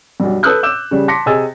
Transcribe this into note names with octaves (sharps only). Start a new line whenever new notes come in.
B1 G2
A4 B4 D#6 E6 F#6 G6
D6 E6 G6 E7
C#3 G3
A5 C6 D6 A#6 B6 C#7
C3 G#4 D#5 G#5 E6 A6